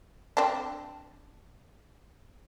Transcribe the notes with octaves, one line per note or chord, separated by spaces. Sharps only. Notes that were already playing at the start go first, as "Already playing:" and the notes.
C4 D4